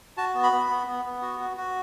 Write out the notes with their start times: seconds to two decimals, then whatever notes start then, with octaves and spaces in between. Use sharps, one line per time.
0.17 F#4 A5
0.35 B3
0.43 B5
0.52 B3
0.70 B3
0.87 B3
1.05 B3
1.22 F#4
1.40 F#4
1.57 F#4